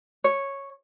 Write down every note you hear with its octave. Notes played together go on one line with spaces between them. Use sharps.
C#5